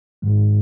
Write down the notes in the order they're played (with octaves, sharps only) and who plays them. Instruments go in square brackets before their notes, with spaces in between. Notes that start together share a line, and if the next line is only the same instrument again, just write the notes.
[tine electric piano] G#2 D#3 G#3